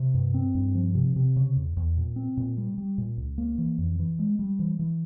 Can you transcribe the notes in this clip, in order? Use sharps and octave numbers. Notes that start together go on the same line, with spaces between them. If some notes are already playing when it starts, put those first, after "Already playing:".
Already playing: C3
G2
C4
G2
F3
C3
C3
C#3
E2
E2
A#2
C4
A#2
G3
G3
A#2
C#2
A#3
E3
F2
E3
G#3
G3
E3
E3